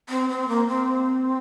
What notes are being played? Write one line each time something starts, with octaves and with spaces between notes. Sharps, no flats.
C4
C4
A#3
C4